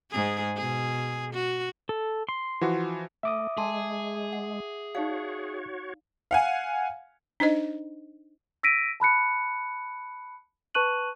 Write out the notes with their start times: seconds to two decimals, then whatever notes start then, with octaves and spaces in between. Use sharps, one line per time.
0.10 G#2 G#4
0.56 B2 G#4
1.33 F#4
1.89 A4
2.29 C6
2.61 E3 F3 F#4
3.23 A3 E5 D6 D#6
3.57 G#3 G#4 A4 A5 C6
4.33 F#5
4.95 D#4 F#4 C#5 D5 F5
6.31 F5 F#5 G#5
7.40 D4 D#4 C5 D#5
8.63 E6 A#6 B6 D7 D#7
9.00 A5 B5 F#6 C#7
10.75 B4 A5 C#6 F#6 D#7 F#7